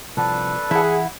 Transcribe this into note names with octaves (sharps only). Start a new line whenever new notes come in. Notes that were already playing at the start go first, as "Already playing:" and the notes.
C2 F3 D4 A4 B4 F#5
E3 E4 G#4 F#5